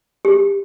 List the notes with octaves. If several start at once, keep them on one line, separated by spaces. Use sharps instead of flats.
G4